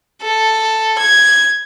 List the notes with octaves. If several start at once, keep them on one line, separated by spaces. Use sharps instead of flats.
A4
G#6